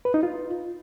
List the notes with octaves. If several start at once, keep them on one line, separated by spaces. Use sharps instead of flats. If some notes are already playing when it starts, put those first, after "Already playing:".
B4
D#4
F4